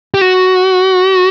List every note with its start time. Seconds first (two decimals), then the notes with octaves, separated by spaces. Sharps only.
0.14 G4
0.21 F#4